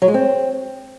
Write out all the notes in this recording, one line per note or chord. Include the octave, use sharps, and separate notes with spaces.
F#3
G#3
C4